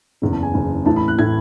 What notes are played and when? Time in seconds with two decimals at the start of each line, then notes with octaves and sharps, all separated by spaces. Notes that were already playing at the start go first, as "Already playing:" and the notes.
0.22 F#1 E2 C#3
0.32 A5
0.43 G#5
0.54 F#1 E2 C#3
0.85 A1 A2 E3 A5
0.96 B5
1.08 F#6
1.18 A2 E3 G#6